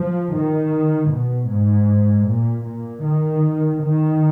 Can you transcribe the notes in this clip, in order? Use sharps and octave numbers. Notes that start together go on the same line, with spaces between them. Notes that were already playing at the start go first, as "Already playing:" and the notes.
Already playing: F3
D#3
B2
G#2
A#2
A#2
D#3
D#3